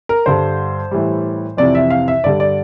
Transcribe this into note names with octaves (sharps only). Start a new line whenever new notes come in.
A#4
G2 D3 G3 C5
A2 E3 G3
F2 C3 E3 D5
E5
F5
E5
G2 D3 G3 D5
D5